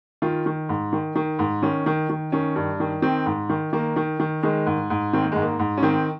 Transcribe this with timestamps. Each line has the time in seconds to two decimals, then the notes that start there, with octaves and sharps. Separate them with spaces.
0.22 D#3 F4
0.46 D#3
0.69 G#2
0.93 D#3
1.15 D#3
1.39 G#2
1.62 D#3 C#4
1.86 D#3
2.09 D#3
2.32 D#3 C#4
2.56 G2
2.80 D#3
3.02 D#3 C4
3.26 G#2
3.49 D#3
3.73 D#3 A#3
3.96 D#3
4.20 D#3
4.43 D#3 G#3
4.66 G#2
4.90 G#2
5.13 D#3 C4
5.23 A#3
5.32 G#2 G#3
5.42 A#3
5.59 G#2
5.77 C#4
5.83 D#3 C4